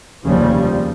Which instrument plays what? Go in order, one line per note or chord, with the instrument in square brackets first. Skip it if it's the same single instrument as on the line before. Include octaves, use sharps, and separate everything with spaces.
[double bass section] F1 D#2 C#3 F3 G3